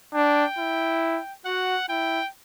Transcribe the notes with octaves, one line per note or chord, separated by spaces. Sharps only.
D4 G5
E4
F#4 F#5
E4 G5